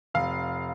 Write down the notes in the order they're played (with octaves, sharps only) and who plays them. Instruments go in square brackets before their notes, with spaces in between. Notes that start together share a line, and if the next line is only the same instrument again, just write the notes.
[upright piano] F1 F5